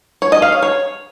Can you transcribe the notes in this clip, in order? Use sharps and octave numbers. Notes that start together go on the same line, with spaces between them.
C#5
D#5
F5
C#5
C#5